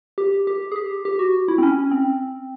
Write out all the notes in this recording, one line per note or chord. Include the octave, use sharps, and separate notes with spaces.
G4
G4
G#4
G4
G4
F#4
E4
C4
C#4
C4